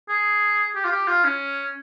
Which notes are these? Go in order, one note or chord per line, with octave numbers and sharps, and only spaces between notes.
G#4
G4
F4
G4
F4
C#4